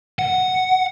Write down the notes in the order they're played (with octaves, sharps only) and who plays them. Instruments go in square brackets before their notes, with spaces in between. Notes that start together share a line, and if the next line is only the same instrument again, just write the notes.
[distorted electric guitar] F#5